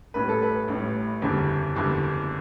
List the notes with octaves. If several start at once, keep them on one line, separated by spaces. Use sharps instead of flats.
A1 A2 G3 B4
A4
B4
A1 A2 G3
F#1 E2 D3 G3
F#1 E2 D3 G3